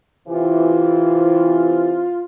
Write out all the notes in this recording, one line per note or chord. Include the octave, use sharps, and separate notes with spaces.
C3 E3 F4